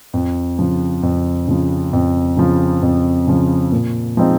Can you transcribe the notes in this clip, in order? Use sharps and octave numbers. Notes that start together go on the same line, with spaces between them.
F2
C#3 F3
F2
C#3 F3
F2
C#3 F3
F2
C#3 F3
A#2
F3 G#3 C4 D#4